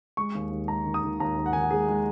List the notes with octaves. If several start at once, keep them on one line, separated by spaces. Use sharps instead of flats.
G#3 C#6
D#2
D#2
G#3 A#5
D#3
D#6
D#3
D#2 A#5
D#2
F#5
D#3 G#5
F#5
G#3 G#4
G#3